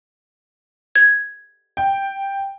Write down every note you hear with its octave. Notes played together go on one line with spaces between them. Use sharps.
G#6
G5